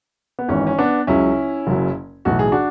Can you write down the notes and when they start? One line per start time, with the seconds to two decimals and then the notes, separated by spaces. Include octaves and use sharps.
0.39 B3
0.48 G#1 G#2 E3 C#4
0.67 C#4
0.78 B3 D4
1.07 C#2 C#3 F#3 C#4 E4
1.67 F#1 F#2 C#3 F#3
2.25 B1 A2 E3 F#4
2.39 G#4
2.52 D4 F#4